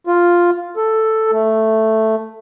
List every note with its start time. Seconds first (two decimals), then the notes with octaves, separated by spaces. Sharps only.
0.07 F4
0.77 A4
1.32 A3